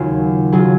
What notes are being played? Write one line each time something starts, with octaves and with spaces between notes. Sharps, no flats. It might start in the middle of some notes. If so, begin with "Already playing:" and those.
Already playing: D#2 C#3 F#3 F4 G#4
C#3 F#3 F4 G#4